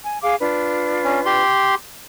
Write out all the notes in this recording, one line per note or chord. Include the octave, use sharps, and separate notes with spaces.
G#5
G#4 F5 D6
D4 F4 B4
C#4
G4 C6